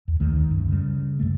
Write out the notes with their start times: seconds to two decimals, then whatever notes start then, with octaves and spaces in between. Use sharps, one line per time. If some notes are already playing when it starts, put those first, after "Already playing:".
0.08 E2
0.20 D2 D#3 A3
0.48 C#2 F#2
0.69 C#3 G3
1.19 F#2 D3 A3